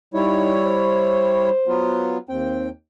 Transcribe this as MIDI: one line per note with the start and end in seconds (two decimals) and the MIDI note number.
0.14 1.50 55
0.14 0.52 63
0.14 1.50 64
0.14 1.50 73
0.66 2.16 72
1.68 2.18 54
1.68 2.18 59
1.68 2.18 65
2.29 2.69 39
2.29 2.68 60
2.29 2.69 79